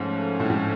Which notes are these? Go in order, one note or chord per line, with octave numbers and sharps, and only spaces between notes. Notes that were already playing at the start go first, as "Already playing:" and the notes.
Already playing: G#2 F3 A3 C#4
A2
G#2